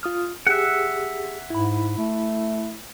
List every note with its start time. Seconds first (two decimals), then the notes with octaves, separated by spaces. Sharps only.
0.03 F4 D#6 F6
0.47 G4 G#4 E5 F#5
1.50 G#2 E4 B5
1.98 A3